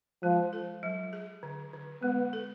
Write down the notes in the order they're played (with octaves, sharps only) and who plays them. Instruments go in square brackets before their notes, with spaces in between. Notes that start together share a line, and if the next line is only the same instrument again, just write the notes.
[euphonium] F3 [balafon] G#3
[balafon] A4
F#3
G#4
D3
D3
[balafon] G#3 [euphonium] B3
[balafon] A4